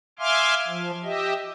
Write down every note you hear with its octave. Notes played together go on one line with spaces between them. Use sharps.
E5 F5 G#5 C6 D6 F6
F3
G4 D#5 E5